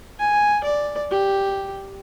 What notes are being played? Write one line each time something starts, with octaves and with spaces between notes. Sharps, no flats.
G#5
D5
G4